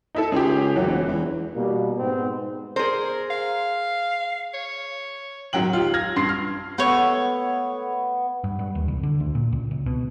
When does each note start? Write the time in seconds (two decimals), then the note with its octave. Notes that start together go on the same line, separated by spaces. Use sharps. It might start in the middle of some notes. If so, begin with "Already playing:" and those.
0.15 D#4 E4 A4
0.32 C#2 G4 G#4
0.76 F#2 E3
0.87 E1
1.08 E2
1.54 B2 G3 A#3
1.98 G#2 B3 C4
2.76 G#4 A#4 C5
3.31 F5
4.54 C#5
5.53 G#2 D#3 F#3 F#5 G5 F#7
5.73 F4 G4
5.94 F6 G#6 A#6
6.16 G2 C6 C7
6.29 F6
6.78 A3 B3 C#5
8.44 G2
8.59 G2
8.75 D#2
8.88 C2
9.03 D3
9.20 D2
9.35 A#2
9.52 C#2
9.71 C#2
9.86 B2